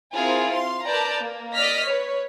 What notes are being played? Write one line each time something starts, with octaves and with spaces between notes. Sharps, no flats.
C4 E4 F4 G#4 A#4
F5 C6
A#4 B4 D5 A5 A#5 G6
A#3
D5 D#5 F6 B6
B4 C#5